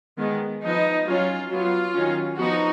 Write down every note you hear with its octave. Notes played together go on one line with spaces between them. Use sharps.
D#3 G#3 B3
F3 B3 D#4
F#3 C#4 F4
F#3 B3 F4
D#3 F#3 C#4
F3 B3 D#4 F#4